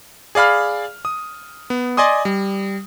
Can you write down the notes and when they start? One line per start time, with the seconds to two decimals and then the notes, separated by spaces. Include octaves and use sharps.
0.35 G#4 D5 F5 B5 F6
1.05 D#6
1.70 B3
1.97 D5 D#5 G#5 C6 D#6
2.25 G3